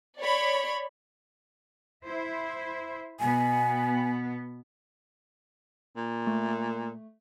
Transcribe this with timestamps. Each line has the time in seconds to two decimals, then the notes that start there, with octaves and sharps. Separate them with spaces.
0.19 C#5 D5 B5
2.04 E4 C5 E5
3.20 B2 B3 G#5
5.96 A#2
6.27 A3